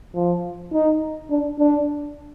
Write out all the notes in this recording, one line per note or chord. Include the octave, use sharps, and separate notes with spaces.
F3
D#4
D4
D4